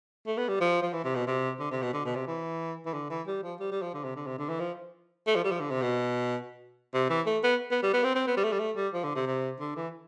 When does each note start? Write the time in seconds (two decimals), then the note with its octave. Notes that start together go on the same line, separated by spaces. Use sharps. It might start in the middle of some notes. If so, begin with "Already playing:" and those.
0.27 A3
0.38 B3
0.49 G3
0.61 F3
0.82 F3
0.93 E3
1.05 C3
1.16 B2
1.27 C3
1.60 D3
1.71 C3
1.82 B2
1.94 D3
2.05 B2
2.16 C3
2.27 E3
2.86 E3
2.94 D3
3.10 E3
3.27 G3
3.43 F3
3.60 G3
3.72 G3
3.82 F3
3.94 D3
4.04 C3
4.16 D3
4.27 C3
4.38 D3
4.49 E3
4.60 F3
5.27 A3
5.36 F3
5.44 G3
5.51 F3
5.61 D3
5.71 C3
5.82 B2
6.94 C3
7.09 E3
7.26 A3
7.44 B3
7.71 B3
7.83 G3
7.93 B3
8.04 C4
8.15 C4
8.27 B3
8.37 G3
8.44 A3
8.52 G3
8.59 A3
8.76 G3
8.94 F3
9.04 D3
9.15 C3
9.26 C3
9.60 D3
9.76 E3